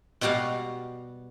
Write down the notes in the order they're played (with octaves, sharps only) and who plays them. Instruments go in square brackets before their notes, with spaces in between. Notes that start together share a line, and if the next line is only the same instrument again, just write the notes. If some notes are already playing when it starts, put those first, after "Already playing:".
[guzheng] B2 G3 F#4 G4 F5